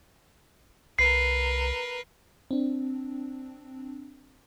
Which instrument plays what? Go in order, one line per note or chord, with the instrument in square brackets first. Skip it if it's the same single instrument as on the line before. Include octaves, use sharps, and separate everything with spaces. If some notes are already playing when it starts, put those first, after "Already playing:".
[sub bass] C2 [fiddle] A#4 B4 [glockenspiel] C7
[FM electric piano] C4 D4